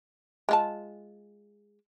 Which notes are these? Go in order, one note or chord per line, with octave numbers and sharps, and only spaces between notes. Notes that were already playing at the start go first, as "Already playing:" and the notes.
G#3 F4 A5